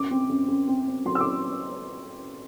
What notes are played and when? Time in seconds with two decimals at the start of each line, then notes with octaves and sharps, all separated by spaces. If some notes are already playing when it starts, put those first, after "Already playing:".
Already playing: F#2 D6
0.11 C4
0.29 F#2
0.48 F#2
0.68 C4
0.87 C4
1.05 F#3 C6
1.15 E6
1.21 D6